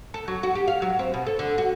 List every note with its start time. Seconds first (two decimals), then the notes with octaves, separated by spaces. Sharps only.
0.14 A4
0.28 F#3
0.43 F#4
0.55 G4
0.68 F5
0.82 F#3
0.99 C4
1.14 B2
1.26 A4
1.39 D3
1.58 F#4